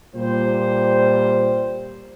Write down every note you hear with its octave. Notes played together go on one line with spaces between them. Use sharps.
A#2 G3 C5